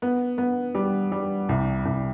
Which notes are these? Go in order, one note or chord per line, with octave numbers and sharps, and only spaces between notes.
B3
B3
G3
G3
C2
C2